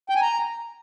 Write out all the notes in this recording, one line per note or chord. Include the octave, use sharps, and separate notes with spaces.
G5
G#5
A#5